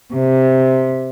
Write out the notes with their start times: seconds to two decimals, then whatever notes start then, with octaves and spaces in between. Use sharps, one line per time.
0.14 C3